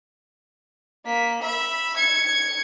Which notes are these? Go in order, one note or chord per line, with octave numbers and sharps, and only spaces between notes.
A#3 B6
E5 B5
G#6 C#7